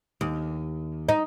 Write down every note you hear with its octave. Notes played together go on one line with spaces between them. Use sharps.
D#2
D#4